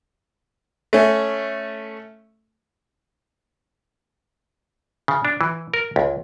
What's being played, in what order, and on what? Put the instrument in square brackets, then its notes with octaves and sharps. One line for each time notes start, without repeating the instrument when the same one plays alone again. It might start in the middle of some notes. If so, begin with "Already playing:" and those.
[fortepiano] A3 C#4
[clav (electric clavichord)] C#3
D4
E3
A#4
C#2